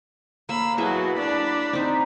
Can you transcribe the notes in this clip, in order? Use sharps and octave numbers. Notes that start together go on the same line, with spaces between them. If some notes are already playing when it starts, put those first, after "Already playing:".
A#3 F5 B5 E6
B2 F#3 E4 F#4 G#4 E5
D4 D5 B5
C4 D#4